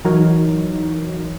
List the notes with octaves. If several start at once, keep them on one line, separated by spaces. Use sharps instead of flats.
E3 F#3 D#4 F#4 A#4 C#5